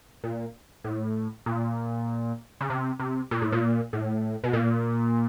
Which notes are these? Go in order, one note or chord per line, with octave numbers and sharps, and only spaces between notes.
A#2
A2
A#2
C#3
C3
C3
A#2
A2
A#2
A2
B2
A#2